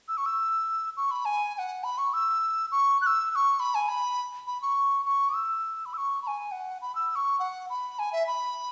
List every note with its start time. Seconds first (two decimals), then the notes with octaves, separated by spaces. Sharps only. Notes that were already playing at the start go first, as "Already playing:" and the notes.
0.08 E6
0.17 C#6
0.26 E6
0.97 C#6
1.11 B5
1.25 G#5
1.54 G#5
1.59 F#5
1.84 B5
1.98 C#6
2.13 E6
2.71 C#6
3.02 F#6
3.06 E6
3.31 E6
3.35 C#6
3.60 B5
3.75 G#5
3.89 B5
4.47 B5
4.62 C#6
5.05 C#6
5.34 E6
5.86 B5
5.93 E6
5.97 C#6
6.22 B5
6.27 G#5
6.52 F#5
6.82 B5
6.95 E6
7.11 E6
7.15 C#6
7.39 F#5
7.70 B5
7.99 G#5
8.12 E5
8.27 B5